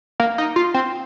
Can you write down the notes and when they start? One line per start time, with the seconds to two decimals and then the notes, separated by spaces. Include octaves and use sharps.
0.20 A#3
0.38 D#4
0.56 F4
0.74 C4